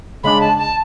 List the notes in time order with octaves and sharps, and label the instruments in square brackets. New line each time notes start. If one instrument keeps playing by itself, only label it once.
[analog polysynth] C#3 G#3 D4 [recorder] B5
[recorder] A5
A5